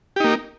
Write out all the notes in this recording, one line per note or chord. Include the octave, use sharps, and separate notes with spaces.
A#3 D#4 G4